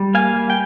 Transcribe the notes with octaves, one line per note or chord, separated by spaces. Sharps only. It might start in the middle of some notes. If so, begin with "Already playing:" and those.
Already playing: G3
A#3 F5 G#5
G3
G5